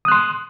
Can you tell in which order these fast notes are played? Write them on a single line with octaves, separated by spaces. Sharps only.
D#6 F#6 C6